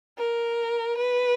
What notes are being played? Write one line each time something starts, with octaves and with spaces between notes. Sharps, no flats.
A#4
B4